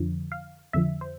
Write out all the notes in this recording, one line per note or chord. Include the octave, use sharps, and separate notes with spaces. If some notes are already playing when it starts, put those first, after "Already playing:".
Already playing: F2 D3 F3
F5
F2 D3 F3 E5
C5